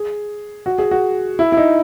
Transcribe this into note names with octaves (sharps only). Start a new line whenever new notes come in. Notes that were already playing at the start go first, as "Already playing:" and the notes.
Already playing: G#4
F#4
G#4
F#4
E4
E4
D#4